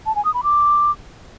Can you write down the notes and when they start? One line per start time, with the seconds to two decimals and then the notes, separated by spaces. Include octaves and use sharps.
0.06 A5
0.15 G#5
0.25 D#6
0.34 B5
0.44 D6